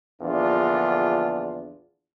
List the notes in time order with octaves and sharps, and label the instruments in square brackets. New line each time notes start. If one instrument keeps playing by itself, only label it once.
[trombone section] A#1 E2 D3 D4 F4